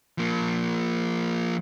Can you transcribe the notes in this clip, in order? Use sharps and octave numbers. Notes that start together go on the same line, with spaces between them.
F3 A#3